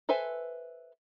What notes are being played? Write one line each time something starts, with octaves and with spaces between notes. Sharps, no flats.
A4 B4 C5 E5 G#5